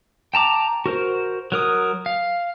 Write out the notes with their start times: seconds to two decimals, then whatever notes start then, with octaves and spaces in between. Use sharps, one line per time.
0.34 G5 A5 A#5 D6
0.86 F#4 A#4 C5
1.52 F#3 A#4 D#6
2.06 F5